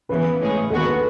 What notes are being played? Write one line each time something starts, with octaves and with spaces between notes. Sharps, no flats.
C#3 E3 B3 B4
A2 G#3 C#4 G#4
D#2 D#3 G#3 B3 F#4 A4
B4